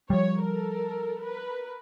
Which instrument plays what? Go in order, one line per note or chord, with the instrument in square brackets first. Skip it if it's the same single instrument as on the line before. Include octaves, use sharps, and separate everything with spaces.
[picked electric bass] F3 G3 [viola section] C#5
[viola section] A4 A#4
A#4 B4